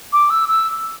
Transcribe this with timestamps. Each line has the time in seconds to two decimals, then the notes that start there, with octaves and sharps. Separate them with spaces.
0.13 D6
0.30 E6
0.49 E6